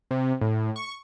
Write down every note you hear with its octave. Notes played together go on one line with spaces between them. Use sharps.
C3
A2
C#6